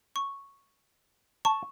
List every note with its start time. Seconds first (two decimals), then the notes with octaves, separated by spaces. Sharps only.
0.16 C#6
1.45 A5 C#6